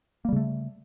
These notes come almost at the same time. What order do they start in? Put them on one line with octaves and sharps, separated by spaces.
A#3 G3 C#3 A3